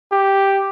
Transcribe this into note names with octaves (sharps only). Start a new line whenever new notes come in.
G4